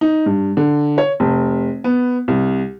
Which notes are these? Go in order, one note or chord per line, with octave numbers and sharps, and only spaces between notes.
D#4
G2
D3
C#5
F1
B3
C2